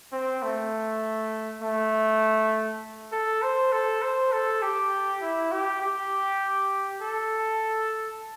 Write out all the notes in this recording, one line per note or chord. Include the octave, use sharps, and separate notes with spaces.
C4
A3
A3
A4
C5
A4
C5
A4
G4
E4
G4
G4
A4